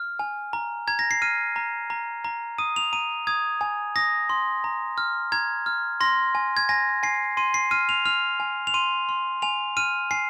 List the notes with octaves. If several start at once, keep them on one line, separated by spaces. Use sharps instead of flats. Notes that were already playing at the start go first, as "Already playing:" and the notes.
Already playing: F6
G#5
A#5
A#5 G#6
A#6
C7
F6 D#7
A#5
A#5
A#5
D#6 D#7
F7
A#5 D#7
D#6 G#6
G#5
D#6 A#6
C6
A#5
F6
A#5 G#6
F6
C6 A#6
G#5
G#6
G#5 A#6
G#5 C7
C6 D#7
C7
F6 D#7
F7
F6 F7
G#5
F7
C6 D#7
C6
G#5 F7
F6 D#7
G#5 C7